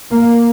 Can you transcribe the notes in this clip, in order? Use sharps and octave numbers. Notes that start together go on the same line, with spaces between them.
A#3